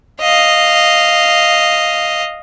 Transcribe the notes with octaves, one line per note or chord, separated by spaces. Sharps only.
D#5 F5